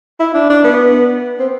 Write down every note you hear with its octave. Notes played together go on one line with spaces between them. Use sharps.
E4
D4
D4
B3
C4